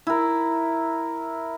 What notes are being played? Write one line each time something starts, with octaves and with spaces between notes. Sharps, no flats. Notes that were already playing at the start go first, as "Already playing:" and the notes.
E4 A#4